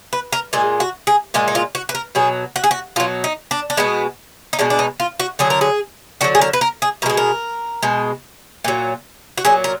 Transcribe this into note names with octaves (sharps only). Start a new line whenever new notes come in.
B4
A#4
A#2 G#3 G#4
F#4
G#4
A#2 G#3 F4
D#4
F4
F#4
B4
A#4
B2 F#3 G#4
F#4
G#4
F#4
B2 F#3 F4
D#4
D4
D4
B2 G#3 B3
D#4
B2 G#3 D4
D4
D#4
F4
F#4
D3 F#3 G#4
A#4
G#4
D3 F#3 F#4
G#4
A#4
B4
A#4
G#4
B2 G#3 G#4 A#4
A#4
B2 G#3
A#2 F#3
F#4
A#2 F#3 G#4
A#4